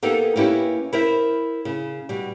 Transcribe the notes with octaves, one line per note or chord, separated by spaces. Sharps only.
A#3 B3 D#4 G4 A4 A#4
A#3 C#4 E4 G4 B4
E4 A#4 C5 E5
C#3
B2 G3